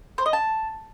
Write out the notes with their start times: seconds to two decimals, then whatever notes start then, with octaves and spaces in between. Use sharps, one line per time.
0.18 C5
0.26 D#5
0.33 A5